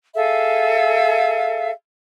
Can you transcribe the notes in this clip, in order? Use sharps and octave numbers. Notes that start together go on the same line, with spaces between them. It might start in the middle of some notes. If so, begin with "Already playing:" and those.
G#4 A4 E5 F5